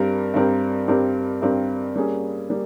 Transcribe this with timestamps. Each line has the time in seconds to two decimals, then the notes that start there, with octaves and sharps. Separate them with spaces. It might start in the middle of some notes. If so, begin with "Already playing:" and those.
Already playing: G2 G3 C4 G4 A#4
0.34 G2 G3 C4 G4 A#4
0.88 G2 G3 C4 G4 A#4
1.42 G2 G3 C4 G4 A#4
1.96 G3 A#3 C#4 G#4
2.50 G3 A#3